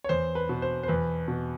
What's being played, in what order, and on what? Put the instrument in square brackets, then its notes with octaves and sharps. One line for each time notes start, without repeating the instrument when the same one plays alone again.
[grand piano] C#5
E2 C5
B4
B2
C5
C5
E2 B4
B2